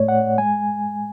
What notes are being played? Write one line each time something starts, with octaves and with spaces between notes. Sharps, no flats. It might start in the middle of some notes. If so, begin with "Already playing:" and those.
Already playing: A2 A3 C#5 D5
F#5
G#3 G#5